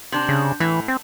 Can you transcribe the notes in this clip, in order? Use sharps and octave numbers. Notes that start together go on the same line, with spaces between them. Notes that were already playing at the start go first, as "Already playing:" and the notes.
C3 D4
C#3
A2 E3
C4